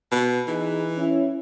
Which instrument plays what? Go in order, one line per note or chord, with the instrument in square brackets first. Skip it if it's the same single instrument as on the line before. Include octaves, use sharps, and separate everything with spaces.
[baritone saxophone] B2
[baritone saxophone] E3 [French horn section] D#4 G#4
[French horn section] C#4 E4